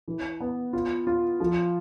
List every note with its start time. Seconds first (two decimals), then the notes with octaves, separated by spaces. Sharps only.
0.08 E3
0.40 B3
0.73 F4
1.07 F4
1.40 F3